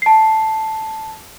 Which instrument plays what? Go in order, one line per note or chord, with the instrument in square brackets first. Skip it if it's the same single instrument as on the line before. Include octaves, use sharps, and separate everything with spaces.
[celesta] A5 C7